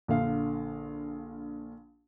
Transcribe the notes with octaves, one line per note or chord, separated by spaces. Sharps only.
A#1 D3 F5